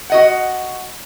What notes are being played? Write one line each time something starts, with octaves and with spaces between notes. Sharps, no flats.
F#4 D#5 F#5